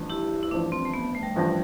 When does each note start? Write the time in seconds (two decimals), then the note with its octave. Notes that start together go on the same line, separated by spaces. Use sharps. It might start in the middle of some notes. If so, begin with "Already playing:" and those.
Already playing: A1 G2 F3
0.10 E4 G4
0.43 E4
0.51 A1 G2 F3 D4
0.72 C4
0.85 A3
0.94 B3
1.15 A3
1.23 G3
1.36 A1 G2 F3 G3